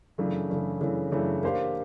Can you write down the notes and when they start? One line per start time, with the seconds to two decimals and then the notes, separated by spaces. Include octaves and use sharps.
0.18 F#2 C#3 E3 A3 D4
0.50 F#2 C#3 E3 A3 D4
0.81 F#2 C#3 E3 A3 D4
1.11 F#2 C#3 E3 A3 D4
1.43 A#3 D4 G4 C5 F5